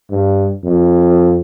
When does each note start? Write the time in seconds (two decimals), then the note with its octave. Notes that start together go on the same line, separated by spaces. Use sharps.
0.10 G2
0.64 F2